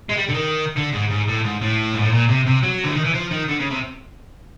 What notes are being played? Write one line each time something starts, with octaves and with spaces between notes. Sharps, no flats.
G#3
G3
D3
D#3
D3
G#2
G#2
A2
G#2
A2
G#2
A2
A#2
C3
C3
F#3
D3
D#3
E3
F3
D#3
D3
C#3
C3